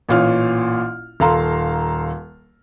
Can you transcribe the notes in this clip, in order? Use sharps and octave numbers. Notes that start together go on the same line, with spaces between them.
A1 A#2 F4 C#5 F6
D#1 A4 F5 A#5 C6